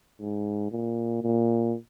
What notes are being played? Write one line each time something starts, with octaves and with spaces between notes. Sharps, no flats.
G#2
A#2
A#2